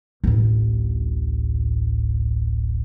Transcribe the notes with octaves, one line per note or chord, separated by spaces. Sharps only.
D1 A1